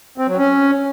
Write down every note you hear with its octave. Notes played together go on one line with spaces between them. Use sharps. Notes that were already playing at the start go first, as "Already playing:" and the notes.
C4
F#3
C#4